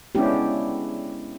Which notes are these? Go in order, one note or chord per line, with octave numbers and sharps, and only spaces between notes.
G#3 B3 C#4 D4 E4 G4